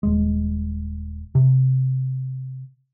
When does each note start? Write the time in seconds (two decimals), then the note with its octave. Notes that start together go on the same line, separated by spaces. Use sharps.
0.03 D#1 G#3
1.35 C3